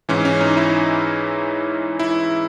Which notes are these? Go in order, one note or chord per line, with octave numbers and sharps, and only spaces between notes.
G#2 E3 C#4
C#4
D#4
E4
E4